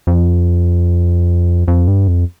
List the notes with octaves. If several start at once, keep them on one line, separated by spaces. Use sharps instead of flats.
F2
F2
G2
F2